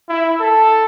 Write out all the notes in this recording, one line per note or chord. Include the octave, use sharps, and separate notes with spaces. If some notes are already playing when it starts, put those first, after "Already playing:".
E4
A4